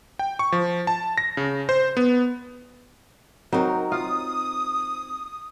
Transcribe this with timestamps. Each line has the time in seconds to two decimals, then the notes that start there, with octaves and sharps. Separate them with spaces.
0.19 G5
0.39 C#6
0.52 F3
0.87 A5
1.18 A#6
1.37 C#3
1.69 C5
1.97 B3
3.52 F#3 C4 D#4 A#4
3.92 F4 D#6